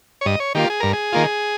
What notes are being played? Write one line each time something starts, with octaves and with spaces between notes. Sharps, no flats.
C#5
G2 D#5
C#5
D#3 A#3 F4 G4
G#4
G2 A#4
G#4
D#3 A#3 F4